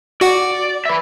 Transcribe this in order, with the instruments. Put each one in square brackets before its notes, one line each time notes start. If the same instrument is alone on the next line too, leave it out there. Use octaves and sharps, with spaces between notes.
[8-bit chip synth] F#4 F#5 [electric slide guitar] D5
[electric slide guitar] B4 E5